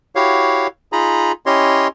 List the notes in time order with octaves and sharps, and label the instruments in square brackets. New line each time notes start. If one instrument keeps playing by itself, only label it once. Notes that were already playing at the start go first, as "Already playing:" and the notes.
[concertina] E4 F#4 G4 C#5 F5
D#4 F4 G#4 A#5 B5
C#4 E4 G4 C#5 D#5 C6